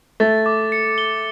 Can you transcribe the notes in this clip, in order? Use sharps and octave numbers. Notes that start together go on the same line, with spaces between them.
A3 A6
D6
C#7
G7